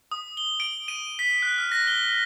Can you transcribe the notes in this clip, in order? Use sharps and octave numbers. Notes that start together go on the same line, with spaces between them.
D#6
G7
D7
D#7
B6
F#6
F6
A#6
G7